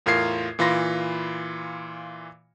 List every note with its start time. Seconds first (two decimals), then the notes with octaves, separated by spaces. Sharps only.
0.06 E2 A2 F4 A#4 G#6 C7
0.59 A#2 E3 F4 B5 C6 A#6